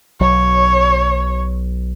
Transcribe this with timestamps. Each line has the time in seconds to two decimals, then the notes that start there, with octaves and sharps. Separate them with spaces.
0.21 B1 F#3 C#5